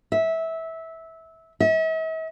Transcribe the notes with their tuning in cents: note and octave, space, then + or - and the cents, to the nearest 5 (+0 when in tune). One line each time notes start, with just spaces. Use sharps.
E5 -20
E5 -45